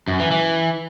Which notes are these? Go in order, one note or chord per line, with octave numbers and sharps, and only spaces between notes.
F#2
E3
E3